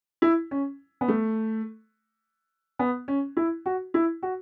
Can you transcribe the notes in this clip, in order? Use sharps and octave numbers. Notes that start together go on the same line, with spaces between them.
E4
C#4
B3
A3
B3
C#4
E4
F#4
E4
F#4